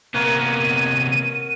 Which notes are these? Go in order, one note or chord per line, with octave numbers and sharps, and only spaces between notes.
C3 A#3 B3 A#4 C#5 F#5 D#7